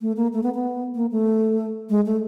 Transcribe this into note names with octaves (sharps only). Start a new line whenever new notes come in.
A3
A#3
A3
B3
B3
A#3
A3
G#3
A3